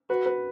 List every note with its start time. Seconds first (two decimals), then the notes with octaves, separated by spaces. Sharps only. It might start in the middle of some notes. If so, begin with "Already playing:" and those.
0.09 F#4 B4
0.26 B4